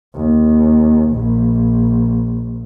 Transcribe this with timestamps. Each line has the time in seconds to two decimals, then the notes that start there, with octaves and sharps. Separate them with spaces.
0.14 D#2
1.10 A#1